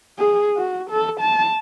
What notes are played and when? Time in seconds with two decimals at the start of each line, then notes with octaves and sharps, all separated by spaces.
0.19 G#4
0.57 F#4
0.90 A4
1.20 A5